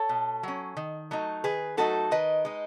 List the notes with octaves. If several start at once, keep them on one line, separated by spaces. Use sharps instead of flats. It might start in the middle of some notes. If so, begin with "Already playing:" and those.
Already playing: A4 C#5
B2
F#3 C#4
D#3
F#3 A3 D#4
D#3 G#4 B4
F#3 A3 D#4 F#4 A4
D#3 B4 D#5
G#3 D#4